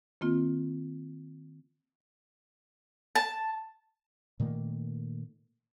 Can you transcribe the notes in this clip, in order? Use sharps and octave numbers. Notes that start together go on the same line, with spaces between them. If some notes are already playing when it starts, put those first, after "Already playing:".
D#3 A#3 C4 F4
A5
A#2 D#3 A3 A#3